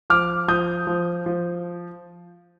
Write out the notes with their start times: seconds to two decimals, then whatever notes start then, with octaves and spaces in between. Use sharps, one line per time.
0.10 F3 D6 F6
0.48 F3 D#6 G6
0.87 F3
1.26 F3